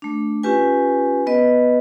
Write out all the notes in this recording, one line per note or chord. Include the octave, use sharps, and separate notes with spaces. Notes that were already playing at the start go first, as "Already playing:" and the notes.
A3 D4
C#4 F4 G4 B4 G#5
B3 B4 D#5